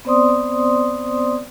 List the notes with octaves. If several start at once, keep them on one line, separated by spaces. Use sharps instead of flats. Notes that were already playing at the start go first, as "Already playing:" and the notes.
B3 C4 C5 D5 C6 D#6